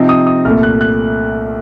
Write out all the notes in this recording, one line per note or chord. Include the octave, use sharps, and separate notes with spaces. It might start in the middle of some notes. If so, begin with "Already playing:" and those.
Already playing: C3 F3 C4 D#4
D#6
D#6
C2 A#2 A3 F6
F#6
F#6